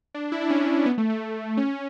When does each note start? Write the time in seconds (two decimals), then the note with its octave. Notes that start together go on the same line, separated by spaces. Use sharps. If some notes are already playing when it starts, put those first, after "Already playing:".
0.14 D4
0.32 E4
0.41 D4
0.50 C#4
0.86 B3
0.98 A3
1.10 A3
1.57 C#4